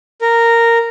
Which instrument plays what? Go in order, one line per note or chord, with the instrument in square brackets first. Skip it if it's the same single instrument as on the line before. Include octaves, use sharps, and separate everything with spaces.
[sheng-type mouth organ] A#4